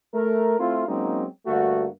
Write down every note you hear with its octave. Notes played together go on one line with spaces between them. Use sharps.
A3 A#4
A3 C4 E4 F4
F#3 G#3 A#3 C4 C#4 D#4
G2 D3 A3 A#3 F#4